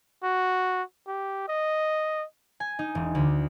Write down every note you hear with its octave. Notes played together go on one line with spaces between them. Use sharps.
F#4
G4
D#5
G#5
D#4
E1
D2